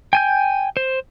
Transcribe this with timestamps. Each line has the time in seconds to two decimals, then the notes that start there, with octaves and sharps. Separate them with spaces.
0.13 G5 G#5 G6
0.77 C5